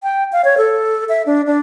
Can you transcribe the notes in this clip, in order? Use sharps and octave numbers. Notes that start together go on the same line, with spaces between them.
G5
F5
C#5
A4
E5
D4
D4